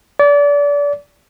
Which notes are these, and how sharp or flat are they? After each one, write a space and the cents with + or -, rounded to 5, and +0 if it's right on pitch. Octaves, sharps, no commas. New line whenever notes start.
D5 -30